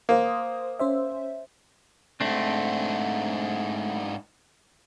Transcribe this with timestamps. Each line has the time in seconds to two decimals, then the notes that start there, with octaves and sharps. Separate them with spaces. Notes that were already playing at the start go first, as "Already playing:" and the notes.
0.09 A#3 C5 D#6
0.79 C#4 C5 E5
2.21 G#2 A3 C4 D4